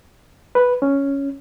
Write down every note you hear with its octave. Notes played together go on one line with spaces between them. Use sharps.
B4
C#4